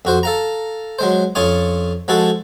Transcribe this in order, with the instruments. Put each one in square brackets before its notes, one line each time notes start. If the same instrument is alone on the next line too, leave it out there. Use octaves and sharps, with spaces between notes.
[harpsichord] F2 F#4 C5
A4 F5 A#5
F#3 G#3 C5
F2 C#4 F4 C#5 F5 D#6
F3 G#3 F#4 G#4 A4